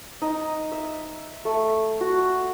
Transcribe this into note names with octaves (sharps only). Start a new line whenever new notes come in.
D#4
E5
A3
F#4